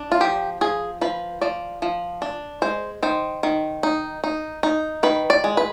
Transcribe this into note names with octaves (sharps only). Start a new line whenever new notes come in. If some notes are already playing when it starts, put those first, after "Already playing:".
Already playing: D4
F4
F3 G4
F3 G#4
F3 B4
F3 D5
F3
D4
G#3 C5
D#3 C5
D#3
D#4
D#4
D#4
D#3 B4
D5
G#3
B4